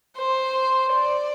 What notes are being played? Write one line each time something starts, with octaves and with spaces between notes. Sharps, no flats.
C5
D5